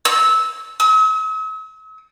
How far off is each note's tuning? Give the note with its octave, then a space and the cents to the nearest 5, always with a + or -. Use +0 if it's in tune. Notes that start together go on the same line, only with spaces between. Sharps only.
E6 -15
E6 -45